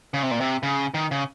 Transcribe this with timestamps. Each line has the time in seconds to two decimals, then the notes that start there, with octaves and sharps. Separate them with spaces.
0.14 C#3
0.23 C3
0.31 A#2
0.40 C3
0.63 C#3
0.94 D#3
1.11 C#3